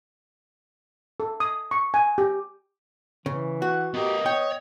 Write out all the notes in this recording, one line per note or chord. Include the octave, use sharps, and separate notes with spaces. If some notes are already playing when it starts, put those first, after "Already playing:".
A4
D#6
C#6
G#5
G4
C#3 E3
F#4 F#5
B3 G4 A#4 D#5
B3 C#5 G5